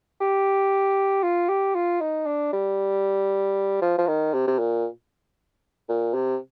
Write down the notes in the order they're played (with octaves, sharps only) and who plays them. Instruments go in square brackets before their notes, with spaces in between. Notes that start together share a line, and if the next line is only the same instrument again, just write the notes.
[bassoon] G4
F4
G4
F4
D#4
D4
G3
F3
F3
D#3
C3
C3
A#2
A#2
C3